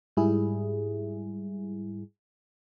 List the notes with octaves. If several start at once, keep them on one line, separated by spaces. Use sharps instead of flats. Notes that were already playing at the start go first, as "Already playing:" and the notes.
G#2 G3 E4 G#4